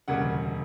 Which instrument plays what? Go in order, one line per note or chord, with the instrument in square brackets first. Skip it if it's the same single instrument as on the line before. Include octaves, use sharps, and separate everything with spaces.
[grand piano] E1 D2 C#3 G3 A#3 F#5